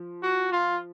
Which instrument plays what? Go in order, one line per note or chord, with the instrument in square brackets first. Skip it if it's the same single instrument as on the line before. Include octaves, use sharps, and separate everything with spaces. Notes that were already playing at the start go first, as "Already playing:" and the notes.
Already playing: [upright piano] F3
[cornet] F#4
F4